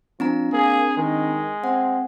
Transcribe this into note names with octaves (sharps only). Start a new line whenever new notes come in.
F3 C4 D4 A#5
A#3 G#4
D#3 G#3
C4 F#5